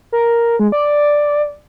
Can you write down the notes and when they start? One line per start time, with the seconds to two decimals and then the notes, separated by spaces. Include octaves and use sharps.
0.12 A#4
0.60 G#3
0.72 D5